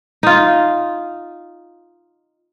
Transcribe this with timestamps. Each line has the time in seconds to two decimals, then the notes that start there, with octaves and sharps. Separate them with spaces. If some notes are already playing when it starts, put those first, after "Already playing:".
0.23 D#4 F4